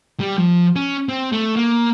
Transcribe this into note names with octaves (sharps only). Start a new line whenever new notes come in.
G3
F3
C#4
C4
A3
A#3